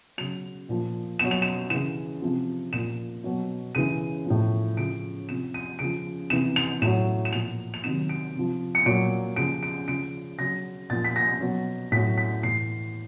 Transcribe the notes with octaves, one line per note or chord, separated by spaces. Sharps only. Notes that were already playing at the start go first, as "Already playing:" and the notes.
C#3 F#3 F7
A#2 F3
B2 F#3 E7
F7
E7
C#3 E3 E7
C3 F3
A#2 F3 E7
B2 F#3
C#3 E3 D#7
A2 F3
C#3 F3 D7
C3 F3 E7
D#7
C#3 F3 D7
C3 E3 E7
F7
A2 F#3 E7
E7
A#2 F3 F7
F7
C3 D#3 F#3 E7
D7
C3 F3
C#7
A#2 F#3 D7
C#3 F3 D7
D7
C#3 F3 D7
C#3 F#3 A#6
A#2 F3 A6
B6
A#6
B2 F#3
A2 F#3 B6
B6
A2 E3 C7